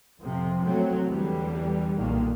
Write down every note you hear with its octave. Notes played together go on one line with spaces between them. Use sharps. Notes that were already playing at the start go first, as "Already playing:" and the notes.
F2 C3 F3
F#3 A3 C4
E2 D3 E3 G3
B1 A#2 D3 D#3 A#3